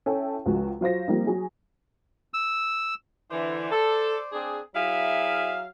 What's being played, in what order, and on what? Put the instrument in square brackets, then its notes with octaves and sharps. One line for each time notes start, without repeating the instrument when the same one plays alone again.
[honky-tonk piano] C#4 E4 A4 G5
C#2 F3 G#3 F#4
F#3 F4 C5 A#6
F3 G3 A#3 C4 D#4
F#3 G#4
[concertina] E6
[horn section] D3 E3 [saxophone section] C5 D5
[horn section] A4
C4 D4 G#4
[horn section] F#3 F5 [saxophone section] E4 G#4 E5